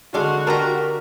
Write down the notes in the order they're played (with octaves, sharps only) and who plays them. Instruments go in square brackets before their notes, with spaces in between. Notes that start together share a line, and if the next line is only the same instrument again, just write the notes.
[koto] D3 G#3 F5 [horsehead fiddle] F#4
[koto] D4 F4 A#5 [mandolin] G4 A#4